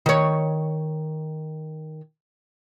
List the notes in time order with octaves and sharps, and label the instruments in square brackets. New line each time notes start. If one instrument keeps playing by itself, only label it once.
[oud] D#3 C#5